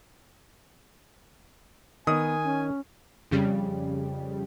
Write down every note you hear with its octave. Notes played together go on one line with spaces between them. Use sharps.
D#3 B3 G#5 D#6
C#4
F2 C#3 G3